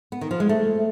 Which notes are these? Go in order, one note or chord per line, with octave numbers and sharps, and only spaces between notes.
B3
D#3
F3
G#3
A3